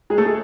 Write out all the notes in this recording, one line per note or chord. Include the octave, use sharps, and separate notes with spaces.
G#3 G#4
A3 A4
G#3 G#4